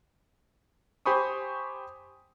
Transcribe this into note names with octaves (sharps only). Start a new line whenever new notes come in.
G4 C5 G#5 B5 C#6 D#6